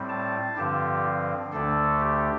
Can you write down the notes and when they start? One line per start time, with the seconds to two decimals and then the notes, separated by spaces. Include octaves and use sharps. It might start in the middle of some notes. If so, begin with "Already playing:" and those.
Already playing: A2 G3 C4
0.09 A5
0.57 G2 D3 F3 C4 G4
1.52 D2 D3 A3 D4 A4
2.00 G4